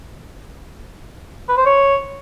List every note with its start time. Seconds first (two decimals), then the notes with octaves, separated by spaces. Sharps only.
1.49 B4
1.57 C5
1.66 C#5